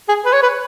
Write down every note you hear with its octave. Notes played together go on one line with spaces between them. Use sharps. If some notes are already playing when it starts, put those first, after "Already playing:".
G#4
B4
C#5
B4